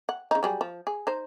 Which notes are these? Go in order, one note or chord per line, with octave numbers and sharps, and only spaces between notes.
F#5
C#3 D#4
F#3 G3 G#4
F3
G#4
D#4 C5